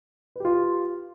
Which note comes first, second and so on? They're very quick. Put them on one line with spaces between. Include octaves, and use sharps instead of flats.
B4 G4 F4